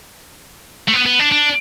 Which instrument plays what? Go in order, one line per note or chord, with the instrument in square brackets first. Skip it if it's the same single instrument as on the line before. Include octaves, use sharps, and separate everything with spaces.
[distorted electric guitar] A3
B3
B3
D4
D4